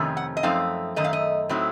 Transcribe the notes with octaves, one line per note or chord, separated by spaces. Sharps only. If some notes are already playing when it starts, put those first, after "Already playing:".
Already playing: F2 C3 D#3 A3 C#4
F#5
D#5
F#2 F3 A3 C4 D#4 F5
F#2 D#3 A3 D#5
F5
D#5
A2 F#3 A3 C4 D#4